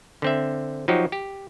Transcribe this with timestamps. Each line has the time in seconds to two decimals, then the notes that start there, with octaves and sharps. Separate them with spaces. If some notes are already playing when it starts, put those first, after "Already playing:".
0.22 D3 C4 E5
0.88 F3 F#3 D#4 F#4 G4
1.12 G4